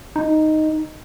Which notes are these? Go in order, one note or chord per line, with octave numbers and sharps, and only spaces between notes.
D#4